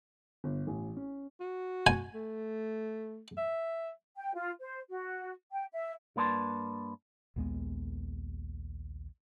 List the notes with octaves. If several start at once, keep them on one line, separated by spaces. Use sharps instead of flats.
G1
A1
C#4
F#4
G#5
A3
E5
G5
F4
C5
F#4
G5
E5
G2 A#3 B4 D5 A5 C6
A#1 D#2 G#3 B3